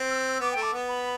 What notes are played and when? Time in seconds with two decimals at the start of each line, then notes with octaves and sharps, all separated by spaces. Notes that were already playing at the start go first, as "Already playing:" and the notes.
Already playing: C4
0.09 E6
0.40 B3 D6
0.52 A3 G5
0.62 D6
0.73 B3
0.89 B5